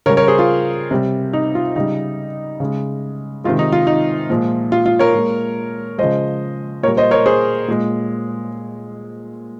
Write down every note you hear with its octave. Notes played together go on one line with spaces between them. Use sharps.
C#3 G3 A#4 C#5
A#4 C#5
G#4 C5
F4
C3 G3
D#4
F4
C#3 G3 D#4
C#3 G#3
C3 D#3 G#3 F4
D#4
F4
D#4
A#2 F3 G#3
F4
F4
A#4 C#5
A#2 G#3
C#3 F3 G#3 C5 D#5
A#2 G3 A#4 C#5
C5 D#5
A#4 C#5
G#4 C5
A#2 G#3